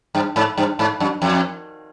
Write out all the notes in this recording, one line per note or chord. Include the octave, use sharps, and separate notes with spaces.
G2
G#2
G2
G#2
F#2
F2